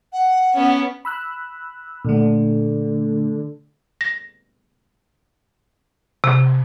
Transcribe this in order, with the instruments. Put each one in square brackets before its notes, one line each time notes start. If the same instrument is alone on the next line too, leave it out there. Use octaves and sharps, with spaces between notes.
[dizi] F#5
[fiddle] B3 C#4
[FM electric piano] B5 E6 F#6
[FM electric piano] A#2 A3 [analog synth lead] D3
[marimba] A#6
C3